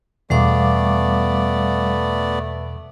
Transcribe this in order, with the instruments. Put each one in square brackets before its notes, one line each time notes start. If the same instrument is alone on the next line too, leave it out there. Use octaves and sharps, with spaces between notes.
[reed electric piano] E2 B2 [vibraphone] G3 F5 D6 [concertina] A3 B3 D5